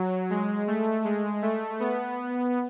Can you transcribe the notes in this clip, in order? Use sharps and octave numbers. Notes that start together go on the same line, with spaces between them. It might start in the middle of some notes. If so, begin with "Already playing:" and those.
Already playing: F#3
G#3
A3
G#3
A3
B3